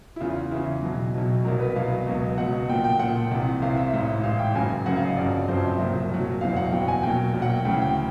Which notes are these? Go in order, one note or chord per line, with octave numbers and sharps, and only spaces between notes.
E4
E2 C#3 E3 F4
E2 C#3 E3 E4
B1 B2 F#3
B1 B2 F#3
C2 B2 F#3 A#4
B4
C2 B2 F#3 F5
C#2 B2 F#3
C#2 B2 F#3 F#5
A#1 A#2 F3 G5
G5
A#1 A#2 F3 F#5
C2 C3 E3
C2 C3 E3 F5
E5
A1 G#2 E3 E5
A1 G#2 E3 F5
G5
F#1 F#2 C#3 F#3 G#5
F#1 F#2 C#3 F#3 F#5
F5
D#5
G1 F2 C#3 F#3 D5
G1 F2 C#3 F#3 C5
E5
C2 A#2 F#3
C2 A#2 F#3
F#1 E2 B2 F#3 F5
F#5
F#1 E2 B2 F#3 G5
G#5
B1 A#2 F#3 G5
B1 A#2 F#3
F#5
G5
D2 C#3 E3 G5
G5